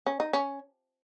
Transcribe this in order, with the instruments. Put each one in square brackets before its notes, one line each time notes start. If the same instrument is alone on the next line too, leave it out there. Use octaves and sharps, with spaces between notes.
[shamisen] C#4
D#4
C#4